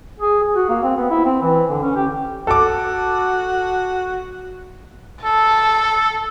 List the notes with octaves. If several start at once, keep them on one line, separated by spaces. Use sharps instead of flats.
G#4
G#4
F#4
A#3
C4
B3
E4
C4
E3
D3
C#4
G4
F#4 A4 D6
A4 A5